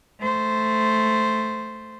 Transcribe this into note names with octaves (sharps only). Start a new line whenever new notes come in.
A3 C5